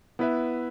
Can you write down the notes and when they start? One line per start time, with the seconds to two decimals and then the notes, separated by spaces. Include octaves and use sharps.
0.19 B3 E4 B4 E5